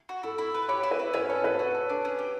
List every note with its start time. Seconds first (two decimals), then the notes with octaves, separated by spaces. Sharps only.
0.09 F#4
0.23 E4 A4
0.38 E4
0.54 B4
0.69 G4 C#5
0.83 E4
0.91 B4
0.99 E4
1.13 C#4 B4
1.29 A4 C#5
1.44 A4 B4
1.59 F#4
1.74 A4
1.89 D4
2.05 C#4
2.19 G4